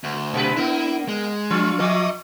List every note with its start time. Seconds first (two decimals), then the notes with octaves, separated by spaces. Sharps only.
0.04 D2
0.34 B2 D4 B4
0.56 A#3 B3 E4
1.09 G#3
1.51 F3 D4 F4 C#6
1.80 F3 D#5 E5 C#6 D6